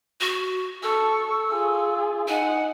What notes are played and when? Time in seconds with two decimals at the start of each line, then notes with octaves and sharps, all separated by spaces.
0.21 F#4
0.83 A4 C#6 E6
1.52 F4 G#4
2.28 D#4 F#5 G#5